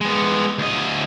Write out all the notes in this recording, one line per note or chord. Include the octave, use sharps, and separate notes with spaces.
G#3 B3
D2 D#5